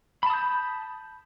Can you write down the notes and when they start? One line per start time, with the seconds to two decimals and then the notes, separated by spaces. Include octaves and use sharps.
0.23 B5
0.26 A5
0.30 D#6
0.34 G6